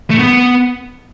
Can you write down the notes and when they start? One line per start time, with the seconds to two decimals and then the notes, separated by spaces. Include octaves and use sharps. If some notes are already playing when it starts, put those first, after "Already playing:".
0.10 A3
0.19 B3